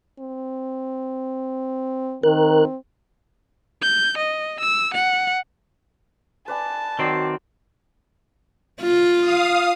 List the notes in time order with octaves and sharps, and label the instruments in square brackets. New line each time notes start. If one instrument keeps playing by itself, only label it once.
[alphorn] C4
[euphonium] D#3 [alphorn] C4 [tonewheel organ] A#4 F#6
[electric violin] G6
D#5
E6
F#5
[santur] B4 D5 G#5 [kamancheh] A5
[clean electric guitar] D#3 C4 [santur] F#3 D5
[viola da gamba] F4
[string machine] F5 D#6